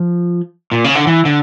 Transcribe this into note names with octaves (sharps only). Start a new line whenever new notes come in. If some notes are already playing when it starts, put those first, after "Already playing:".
Already playing: F3
A#2
C#3
D3
E3
D3